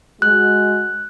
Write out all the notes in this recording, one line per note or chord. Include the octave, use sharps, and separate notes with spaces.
G#3 F#4 F#6